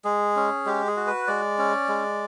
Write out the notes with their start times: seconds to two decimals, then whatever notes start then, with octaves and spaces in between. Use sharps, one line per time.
0.05 G#3 G#4
0.36 C#4
0.66 G#3 G4
0.87 G#4
0.97 F#4
1.07 B4
1.27 G#3 D5
1.59 C#4
1.89 G#3